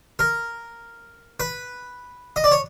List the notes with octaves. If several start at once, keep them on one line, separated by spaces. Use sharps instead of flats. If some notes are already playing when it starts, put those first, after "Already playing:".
A#4
B4
D#5
D5
C#5